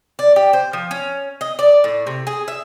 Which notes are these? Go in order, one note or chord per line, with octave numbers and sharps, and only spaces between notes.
D5
G4
C5
F3
C#4
D#5
D5
A2
C3
G#4
E5